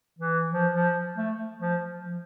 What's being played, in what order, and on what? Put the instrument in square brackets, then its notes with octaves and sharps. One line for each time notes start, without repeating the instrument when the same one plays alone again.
[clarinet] E3
F3
F3
A3
F3
F3